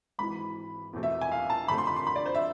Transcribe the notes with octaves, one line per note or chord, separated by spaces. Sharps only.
G#1 G#2 E3 B5
E2 B2 A3 C4
E5
G#5
F5
A5
F2 D3 F3 A3 C4 B5
C6
B5
C6
B5
D5
C5
E5